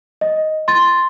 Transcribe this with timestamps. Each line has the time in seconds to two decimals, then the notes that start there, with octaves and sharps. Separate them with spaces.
0.21 D#5
0.68 C6 A6